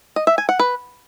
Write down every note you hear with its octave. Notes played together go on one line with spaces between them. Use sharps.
D#5
E5
G#5
F#5
B4